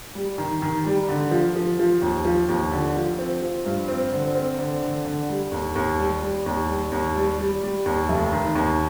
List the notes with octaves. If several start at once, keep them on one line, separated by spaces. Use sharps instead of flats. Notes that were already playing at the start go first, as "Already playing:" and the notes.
G3
D#3
D#3
G3
D3
F3
F3
F3
D#2
F3
D#2
D3
F3
C4
F3
G2
C4
D3
C4
D3
D3
D3
G3
D#2
D#2
G3
G3
D#2
G3
D#2
G3
G3
G3
D#2
F1
D#3
D#2